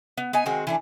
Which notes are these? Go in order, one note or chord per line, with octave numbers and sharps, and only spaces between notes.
B3
B3 D#4 G#5
D#3 G#3 C4 F#4
E3 A3 D4